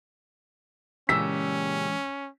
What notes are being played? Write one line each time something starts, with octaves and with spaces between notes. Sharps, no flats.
A#2 C#3 E3 G#3 C#4 G4 E6 B6